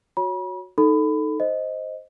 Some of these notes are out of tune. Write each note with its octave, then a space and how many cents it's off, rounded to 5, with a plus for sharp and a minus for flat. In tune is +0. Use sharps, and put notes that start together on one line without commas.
F#4 -15 C#5 +0 B5 -40
D#4 +0 A4 +0 B5 +20
C5 +0 D#5 +0